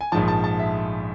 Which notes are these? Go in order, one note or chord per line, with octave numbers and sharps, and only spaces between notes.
G#5
A#1 G#2 F3 A5
A5
A5
E5